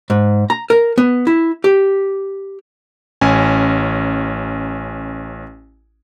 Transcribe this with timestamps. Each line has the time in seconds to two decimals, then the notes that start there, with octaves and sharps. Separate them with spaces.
0.10 G#2
0.50 A#5
0.70 A#4
0.98 B3
1.27 E4
1.64 G4
3.21 A1 C#4 G#5